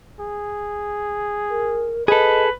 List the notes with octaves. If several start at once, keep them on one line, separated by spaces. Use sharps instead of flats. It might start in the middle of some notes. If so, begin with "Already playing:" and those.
G#4
A#4
G#4 A4 B4 D#5